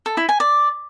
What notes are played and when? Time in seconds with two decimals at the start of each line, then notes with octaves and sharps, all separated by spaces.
0.06 A4
0.17 E4
0.29 G#5
0.40 D5